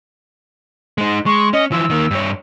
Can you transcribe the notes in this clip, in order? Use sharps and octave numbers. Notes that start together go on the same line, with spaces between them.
G#3 D#4
G#3 C#6
C#4 D#5
E3 F3 E6
D#3 A#3
G2 C#5